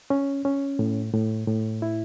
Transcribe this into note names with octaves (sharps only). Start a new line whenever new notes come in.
C#4
C#4
A2
A2
A2
E4